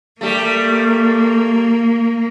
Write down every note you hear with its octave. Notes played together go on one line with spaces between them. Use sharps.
G3 A3 A#3